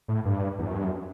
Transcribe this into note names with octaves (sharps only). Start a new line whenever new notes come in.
A2
G2
E2
F#2
G2
F#2